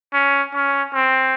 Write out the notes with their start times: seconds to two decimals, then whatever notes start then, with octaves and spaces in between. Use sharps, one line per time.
0.13 C#4
0.54 C#4
0.94 C4